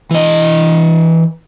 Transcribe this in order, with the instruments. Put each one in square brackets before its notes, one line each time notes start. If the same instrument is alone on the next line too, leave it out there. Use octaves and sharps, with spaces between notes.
[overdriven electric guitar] E3 D#5